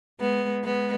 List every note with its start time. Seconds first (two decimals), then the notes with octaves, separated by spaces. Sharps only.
0.20 G#3 B3
0.64 G#3 B3